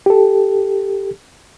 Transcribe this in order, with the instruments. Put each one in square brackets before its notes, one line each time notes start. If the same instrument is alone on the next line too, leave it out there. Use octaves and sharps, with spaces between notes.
[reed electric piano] G4 A4